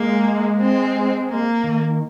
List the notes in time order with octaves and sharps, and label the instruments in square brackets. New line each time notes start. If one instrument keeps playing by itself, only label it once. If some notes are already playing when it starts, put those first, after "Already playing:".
Already playing: [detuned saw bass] G#3 [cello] A#3
[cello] C4
A#3
[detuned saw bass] D#3